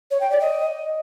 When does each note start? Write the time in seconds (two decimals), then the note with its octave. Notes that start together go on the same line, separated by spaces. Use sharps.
0.11 C#5
0.21 G5
0.30 D5
0.40 D#5